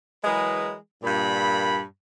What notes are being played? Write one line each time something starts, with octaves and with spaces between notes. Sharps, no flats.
E3 F#3 G#3 G#4 A#4 B4
G2 A#2 B5